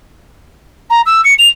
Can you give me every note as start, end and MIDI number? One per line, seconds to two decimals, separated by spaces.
0.90 1.01 82
1.06 1.21 88
1.24 1.34 97
1.39 1.48 101